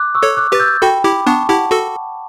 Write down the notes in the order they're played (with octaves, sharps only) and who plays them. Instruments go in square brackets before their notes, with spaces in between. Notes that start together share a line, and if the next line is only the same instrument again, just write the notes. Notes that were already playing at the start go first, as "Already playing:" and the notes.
Already playing: [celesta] D6 F#6
C#6 E6
[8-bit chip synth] A4 C#5
[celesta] D6 F#6
[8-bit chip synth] G4 B4 [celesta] A6
[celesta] E6 G6
[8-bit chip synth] F#4 A4 [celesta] G5 B5
[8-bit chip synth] E4 G4 [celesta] B5 D6
[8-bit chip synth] B3 D4 [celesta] A5 C#6
[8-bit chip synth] E4 G4 [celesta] F#5 A5
[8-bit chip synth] F#4 A4